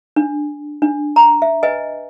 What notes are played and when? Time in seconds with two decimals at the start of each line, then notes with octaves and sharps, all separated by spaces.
0.16 D4
0.82 D4
1.16 A#5
1.42 E5
1.63 B4 D#5 G#5